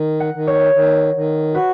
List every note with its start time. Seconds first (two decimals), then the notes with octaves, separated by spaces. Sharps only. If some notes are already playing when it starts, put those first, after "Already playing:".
Already playing: D#3
0.20 F#5
0.34 D#3
0.47 C#5
0.73 D#3
1.15 D#3
1.54 F#4 B4